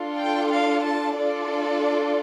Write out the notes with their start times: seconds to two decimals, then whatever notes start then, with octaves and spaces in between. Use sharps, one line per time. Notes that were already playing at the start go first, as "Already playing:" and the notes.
Already playing: D4 F4 A4
0.19 G5
0.53 F5
0.85 A5
1.17 D4 F4 A4 D5